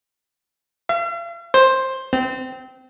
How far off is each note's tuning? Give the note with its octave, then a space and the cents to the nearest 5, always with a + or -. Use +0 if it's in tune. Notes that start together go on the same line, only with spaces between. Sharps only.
F5 -45
C5 +10
C4 -20